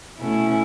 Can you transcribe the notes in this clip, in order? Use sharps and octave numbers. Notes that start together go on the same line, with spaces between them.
B2 A3 C#4 E4